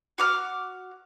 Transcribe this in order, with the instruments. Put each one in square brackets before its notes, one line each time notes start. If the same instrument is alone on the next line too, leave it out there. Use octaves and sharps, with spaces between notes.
[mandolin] F#4 D6 F6